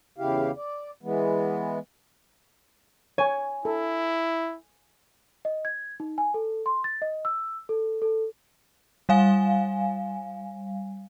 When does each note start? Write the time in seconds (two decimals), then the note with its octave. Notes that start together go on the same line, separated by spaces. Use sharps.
0.18 E2 C#3 E4 G4 F5
0.56 D5
1.03 E3 G#3 B3
3.18 C#5 G#5
3.65 E4 A4
5.45 D#5
5.65 G#6
6.00 D#4
6.18 G#5
6.34 A4
6.66 C6
6.84 A6
7.02 D#5
7.25 E6
7.69 A4
8.02 A4
9.09 G3 F5 G#5